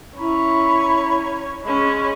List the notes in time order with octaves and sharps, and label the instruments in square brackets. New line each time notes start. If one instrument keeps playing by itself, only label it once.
[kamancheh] C#4 C#5 [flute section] E4 A#5 B5
[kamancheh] G#3 C#4 [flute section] B5